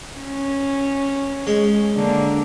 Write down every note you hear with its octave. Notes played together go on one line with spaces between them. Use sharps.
C#4
G#3 C#5
D3 A#3